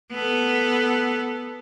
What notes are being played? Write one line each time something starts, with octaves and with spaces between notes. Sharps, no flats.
B3 A4